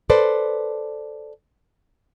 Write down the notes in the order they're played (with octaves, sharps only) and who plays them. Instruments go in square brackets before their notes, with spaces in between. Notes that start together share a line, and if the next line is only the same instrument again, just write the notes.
[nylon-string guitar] A4 B4 C5 D5